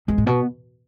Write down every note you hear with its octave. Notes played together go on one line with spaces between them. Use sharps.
E2 G#3
A2
B2 B3